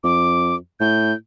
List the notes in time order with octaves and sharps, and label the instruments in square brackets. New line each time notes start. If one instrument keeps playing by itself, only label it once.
[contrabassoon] F2 [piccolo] D6
[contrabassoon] A2 [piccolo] G6